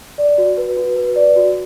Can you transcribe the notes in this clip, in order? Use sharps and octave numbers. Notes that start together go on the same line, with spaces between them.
D5
F#4
B4
F#4
B4
D5
F#4